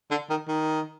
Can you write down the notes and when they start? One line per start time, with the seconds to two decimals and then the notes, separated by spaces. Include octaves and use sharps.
0.11 D3
0.30 D#3
0.48 D#3